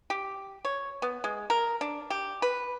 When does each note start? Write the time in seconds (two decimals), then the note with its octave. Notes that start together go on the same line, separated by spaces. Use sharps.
0.10 G4
0.65 C#5
1.02 B3
1.24 G#3
1.50 A#4
1.81 D4
2.10 G4
2.42 B4